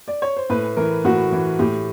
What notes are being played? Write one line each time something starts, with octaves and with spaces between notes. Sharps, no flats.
D5
C#5
C5
A2 B4
E3 A#4
A2 F#4
E3
A2 G4